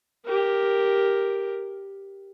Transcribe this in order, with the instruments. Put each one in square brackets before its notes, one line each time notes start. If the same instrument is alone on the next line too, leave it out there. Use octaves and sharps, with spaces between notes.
[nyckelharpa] G4 A#4